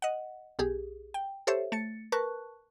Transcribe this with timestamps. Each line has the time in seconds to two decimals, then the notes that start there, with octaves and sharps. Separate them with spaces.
0.02 D#5 F#5
0.59 B1 G4 G#4
1.14 G5
1.47 G4 A4 C5 C#5 E5
1.72 A3 A6 C#7
2.12 A#4 B4 A5 C#6 F#6